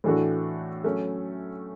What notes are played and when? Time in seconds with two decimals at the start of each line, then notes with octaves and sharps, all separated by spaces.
0.04 A2 E3 A3 D4 F#4
0.84 F#3 A3 C#4